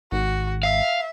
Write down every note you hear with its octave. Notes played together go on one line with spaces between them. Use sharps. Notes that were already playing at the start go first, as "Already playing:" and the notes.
G#1 F#4
E5 F5